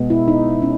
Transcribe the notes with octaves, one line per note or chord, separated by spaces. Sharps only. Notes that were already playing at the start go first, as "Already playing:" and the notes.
Already playing: B2 G#3 B3
E4
D#4
C#4